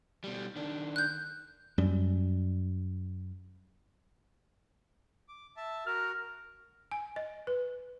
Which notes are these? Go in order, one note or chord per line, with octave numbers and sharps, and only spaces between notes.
B2 G3
D#3 D4
F#6 G6
F#2 G3
D6
E5 A5
F#4 A#4 F6
G#5
D#5
B4